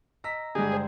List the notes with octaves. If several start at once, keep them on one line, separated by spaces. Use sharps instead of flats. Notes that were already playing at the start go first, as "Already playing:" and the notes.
D#5 A#5 E6 B6
G2 D3 G#3 G4 G#4
C5 G#6